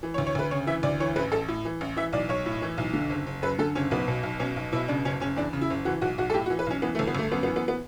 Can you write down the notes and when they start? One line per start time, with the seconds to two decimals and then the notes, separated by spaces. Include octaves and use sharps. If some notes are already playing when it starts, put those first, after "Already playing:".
0.03 E3
0.14 C#5
0.18 D2
0.27 C#5
0.35 D2 B4
0.51 C#3 C#5
0.67 E3 E5
0.83 D2 D5
1.00 E3 C#5
1.16 A1 B4
1.32 A1 A4
1.48 A2
1.65 E3
1.81 A1
1.96 E3 E5
2.13 B1 D5
2.29 B1 C#5
2.46 A2
2.62 E3
2.78 B1
2.93 D3
3.10 F#1
3.26 F#1
3.42 F#2 B4
3.59 D3 A4
3.75 F#1 C#4
3.91 B1 B3
4.08 B2
4.23 B1
4.39 B2 C#4
4.56 B1
4.72 B2 E4
4.88 C#3 D4
5.05 F#1 C#4
5.20 F#1 C#4
5.36 E2 D4
5.53 C#3
5.61 E4
5.70 F#1
5.85 E3 F#4
6.01 B1 F#4
6.18 B1 F#4
6.30 A4
6.34 A2 G4
6.46 F#4
6.50 E3
6.59 B4
6.66 B1 C#4
6.82 E3 B3
6.95 A3
6.99 G1
7.07 B3
7.15 G1 A3
7.32 F#2 B3
7.43 B3
7.47 E3
7.56 B3
7.68 B3